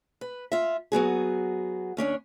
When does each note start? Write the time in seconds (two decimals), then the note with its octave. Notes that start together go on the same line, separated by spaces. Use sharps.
0.21 B4
0.52 F4 E5
0.92 F#3 B3 F#4 G#4
1.97 D#2 C#4 D4 C#5